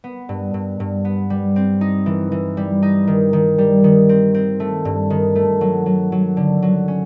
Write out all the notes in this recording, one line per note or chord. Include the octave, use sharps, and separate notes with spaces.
B3
G2
G2
G2
B3
G3
C4
D#4
E3
E3
G3
D#4
D#3
D#3
G3
D#3
C4
C4
A3
G2
D#3
A3
F#3
F#3
F#3
D3
F#3
C#4